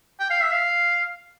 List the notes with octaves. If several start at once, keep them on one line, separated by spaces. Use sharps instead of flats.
G5
F5
E5
F5